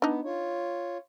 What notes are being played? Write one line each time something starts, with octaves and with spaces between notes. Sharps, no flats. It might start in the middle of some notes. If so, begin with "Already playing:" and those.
B3 D4 D#4
F4 C#5